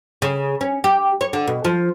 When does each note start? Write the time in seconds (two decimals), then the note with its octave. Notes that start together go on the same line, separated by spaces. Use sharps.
0.22 C#3
0.61 C#4
0.84 G4
1.21 C#5
1.33 D3
1.47 B2
1.65 F3